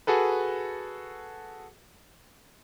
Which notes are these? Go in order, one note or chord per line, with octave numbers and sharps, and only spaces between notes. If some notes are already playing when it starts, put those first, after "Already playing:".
F#4 G#4 A4 B4